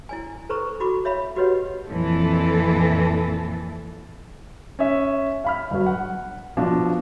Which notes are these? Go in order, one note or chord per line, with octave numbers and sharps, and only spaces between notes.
E4 D5 G#5
A4 B4 C5 A#5 C#6 D#6
E4 F#4 B5 C#6 D6
C#5 E5 F5 B5
F#4 G4 B4 C#5 D#5 F#5
F2 A#2 E3 A4
C#4 E5
F5 B5 F6
G1 F#3
F#5
B2 F3 D4 F4